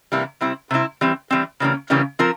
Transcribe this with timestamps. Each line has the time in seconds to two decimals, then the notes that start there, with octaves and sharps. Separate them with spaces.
0.12 C3 E3 G3 A#3 E4
0.41 C3 G3 C4 E4
0.71 C3 G3 C4 E4
1.01 E3 G3 C4
1.31 E3 G3 C4
1.60 C#3 E3 G3 A#3 C#4
1.90 C#3 E3 G3 A#3 C#4
2.19 F3 C4 F4 A#4